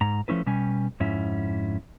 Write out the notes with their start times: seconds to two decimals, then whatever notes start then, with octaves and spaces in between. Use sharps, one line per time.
0.01 G#2 A#5
0.28 F3 A3 C#4 E4 B4
0.46 B2 G3 C#4 G#5
1.00 F2 G#2 C#4 E4